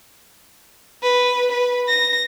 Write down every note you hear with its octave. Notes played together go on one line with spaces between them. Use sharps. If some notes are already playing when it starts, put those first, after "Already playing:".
B4
B4
A#6